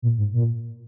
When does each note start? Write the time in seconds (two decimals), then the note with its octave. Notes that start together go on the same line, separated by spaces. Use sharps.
0.02 A#2
0.18 G#2
0.34 A#2